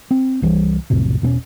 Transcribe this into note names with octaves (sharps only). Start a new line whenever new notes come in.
C4
C2 E3 G3
B1 F2 A2 C3
E1 B2 B3 C#4